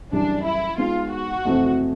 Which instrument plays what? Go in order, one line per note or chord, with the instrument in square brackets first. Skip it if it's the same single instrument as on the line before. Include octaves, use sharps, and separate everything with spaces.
[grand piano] F#2 C#3 E3 G3 [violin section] D4
[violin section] E4
[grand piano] G#3 B3 D#4 [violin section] F4
[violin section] F#4
[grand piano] F2 C3 E3 A3 C4